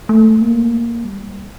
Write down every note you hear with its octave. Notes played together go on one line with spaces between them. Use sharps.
A3
A#3
G3